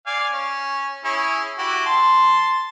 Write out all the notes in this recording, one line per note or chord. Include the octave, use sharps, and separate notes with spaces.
D5 F5 G#5
C#4
C#4 E4 G#4
E4 F#4 G4
A5 C6